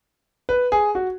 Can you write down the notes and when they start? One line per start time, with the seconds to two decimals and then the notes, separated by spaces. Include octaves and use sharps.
0.49 B4
0.72 G#4
0.95 F#4